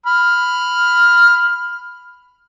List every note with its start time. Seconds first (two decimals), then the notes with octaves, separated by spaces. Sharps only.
0.06 B5 F6